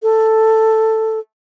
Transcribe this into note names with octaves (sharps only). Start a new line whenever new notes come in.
A4